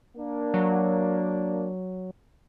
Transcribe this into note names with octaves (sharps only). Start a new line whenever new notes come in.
A#3 D4
F#3